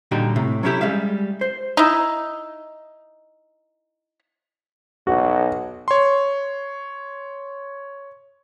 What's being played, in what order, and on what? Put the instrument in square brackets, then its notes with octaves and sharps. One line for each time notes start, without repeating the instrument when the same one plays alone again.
[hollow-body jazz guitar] A#2 D3 G3 D#4 F#4 G4
A2 C3
F#3 C#4 D4 E4 G4 A4
G3 G#3 E5 F5
C5
[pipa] D#4 E4
[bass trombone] B1 [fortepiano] F#4
[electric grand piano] C#5 C6